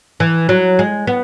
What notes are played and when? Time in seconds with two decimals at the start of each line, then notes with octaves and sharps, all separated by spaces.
0.20 E3
0.49 F#3
0.79 G#3
1.07 B3